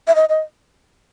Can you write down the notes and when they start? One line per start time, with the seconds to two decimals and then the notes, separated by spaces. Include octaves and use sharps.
0.08 E5
0.15 D#5
0.29 D#5